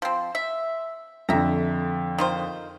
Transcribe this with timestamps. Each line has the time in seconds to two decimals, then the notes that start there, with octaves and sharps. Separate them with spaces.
0.02 F3 C4
0.35 E5
1.29 F2 D3 E5 A#5
2.18 D#3 F4 C5